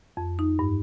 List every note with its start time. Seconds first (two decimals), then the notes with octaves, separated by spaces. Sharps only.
0.17 F2
0.39 D#4
0.59 G2